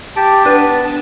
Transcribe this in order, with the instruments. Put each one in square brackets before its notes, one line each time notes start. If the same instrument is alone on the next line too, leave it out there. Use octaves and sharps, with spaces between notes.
[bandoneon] G4 A5 [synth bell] D7
[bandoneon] B3 [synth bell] D4 B4
[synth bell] A6
A5